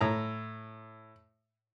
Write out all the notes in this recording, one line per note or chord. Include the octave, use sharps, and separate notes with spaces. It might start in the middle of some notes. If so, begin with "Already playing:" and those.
A2 A#5